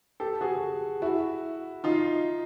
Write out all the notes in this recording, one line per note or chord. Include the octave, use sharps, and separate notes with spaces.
G4 A4
F#4 G#4
E4 F#4
D#4 F4